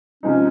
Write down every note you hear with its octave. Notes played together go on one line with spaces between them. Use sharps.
C3 F3 G#3 C4 C#4 D#4